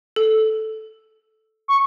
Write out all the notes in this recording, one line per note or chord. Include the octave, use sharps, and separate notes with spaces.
A4
C#6